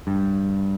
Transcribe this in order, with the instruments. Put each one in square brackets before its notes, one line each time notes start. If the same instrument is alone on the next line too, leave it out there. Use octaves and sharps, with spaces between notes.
[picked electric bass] G2